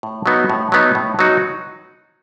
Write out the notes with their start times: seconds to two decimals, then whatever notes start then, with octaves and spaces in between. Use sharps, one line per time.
0.03 A2
0.26 F#3 B3 D#4 F#4
0.50 A2
0.72 F#3 B3 D#4 F#4
0.95 A2
1.19 F#3 B3 D#4 F#4